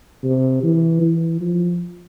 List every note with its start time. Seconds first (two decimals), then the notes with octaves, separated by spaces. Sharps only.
0.24 C3
0.63 E3
1.01 E3
1.41 F3